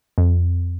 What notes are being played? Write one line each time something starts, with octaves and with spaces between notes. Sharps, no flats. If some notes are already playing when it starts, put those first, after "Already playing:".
F2